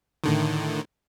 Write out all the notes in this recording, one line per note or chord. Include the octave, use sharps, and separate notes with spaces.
A2 D3 D#3